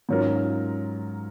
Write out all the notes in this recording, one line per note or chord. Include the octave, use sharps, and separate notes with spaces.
G#2 F#3 C#4 F4 A#4